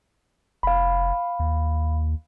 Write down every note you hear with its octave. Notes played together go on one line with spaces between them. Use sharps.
F1 F5 B5
D#2